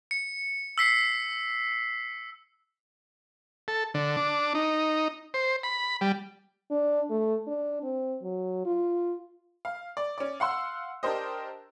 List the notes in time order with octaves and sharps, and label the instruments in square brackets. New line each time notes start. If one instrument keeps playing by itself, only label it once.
[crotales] C#7
E6 B6 C7
[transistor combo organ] A4
D3
D4
D#4
C5
B5
G3
[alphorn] D4
A3
D4
C4
F#3
F4
[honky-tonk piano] F5
D5
C#4 D5
F5 F#5 C6 E6
D4 G4 A#4 C5 D#5